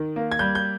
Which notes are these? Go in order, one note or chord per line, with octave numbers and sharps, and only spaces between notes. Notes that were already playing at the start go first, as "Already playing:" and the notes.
Already playing: D#3
A#3
G#6
G3 G6
G6